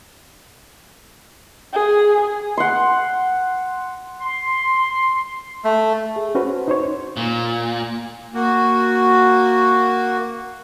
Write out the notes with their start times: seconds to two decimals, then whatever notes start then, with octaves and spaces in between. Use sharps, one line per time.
1.73 G#4
2.57 F#5 C6
4.22 C6
5.64 A3
6.16 G#4
6.35 C#4 F#4 B4 C5
6.68 D#4 C5 C#5
7.17 A#2
8.34 A#3 F#4